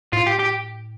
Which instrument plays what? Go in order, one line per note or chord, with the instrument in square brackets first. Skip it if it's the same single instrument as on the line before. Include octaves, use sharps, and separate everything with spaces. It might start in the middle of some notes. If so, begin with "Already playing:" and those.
[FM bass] A2 [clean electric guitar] F4
[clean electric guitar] G4
G4